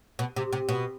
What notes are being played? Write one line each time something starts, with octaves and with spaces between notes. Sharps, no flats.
B2
C3
C3
B2